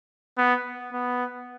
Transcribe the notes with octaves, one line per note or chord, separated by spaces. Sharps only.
B3
B3